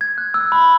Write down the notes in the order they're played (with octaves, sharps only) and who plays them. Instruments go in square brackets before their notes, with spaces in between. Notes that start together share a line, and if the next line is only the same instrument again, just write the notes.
[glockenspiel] G#6
F#6
E6
B5